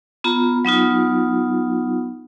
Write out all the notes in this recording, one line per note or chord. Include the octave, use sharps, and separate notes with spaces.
B3 F4 A#5
F#3 B3 D#4 F4